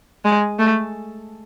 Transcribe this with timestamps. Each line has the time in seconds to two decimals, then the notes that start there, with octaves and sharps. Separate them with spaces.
0.25 G#3
0.59 A3